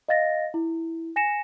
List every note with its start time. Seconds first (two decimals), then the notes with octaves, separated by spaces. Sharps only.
0.08 D#5 F5 A6 A#6
0.54 E4
1.16 G#5 A#6 C#7 E7